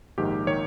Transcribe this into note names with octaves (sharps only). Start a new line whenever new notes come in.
A#1 G#2 D#3 G4
D#3 C#5